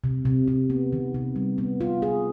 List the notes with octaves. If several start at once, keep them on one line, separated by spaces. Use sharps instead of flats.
C3
C3
C3
B3
D#3
C3
G3
B3
F4
G#4